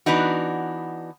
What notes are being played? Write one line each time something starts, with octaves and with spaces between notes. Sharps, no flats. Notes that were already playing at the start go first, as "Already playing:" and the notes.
E3 B3 D4 D#4 F#4